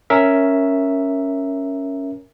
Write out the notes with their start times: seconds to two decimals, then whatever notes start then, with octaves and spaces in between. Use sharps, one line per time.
0.10 C#4 A#4 E5